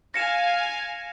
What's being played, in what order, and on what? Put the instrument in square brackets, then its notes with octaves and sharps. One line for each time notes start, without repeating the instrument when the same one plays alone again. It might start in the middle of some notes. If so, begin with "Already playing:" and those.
[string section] F5 G#5 [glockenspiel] A#6 C#7 E7